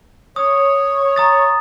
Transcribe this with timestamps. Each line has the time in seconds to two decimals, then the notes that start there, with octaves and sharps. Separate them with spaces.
0.36 C#5 D#6
1.16 A#5 D#6 A6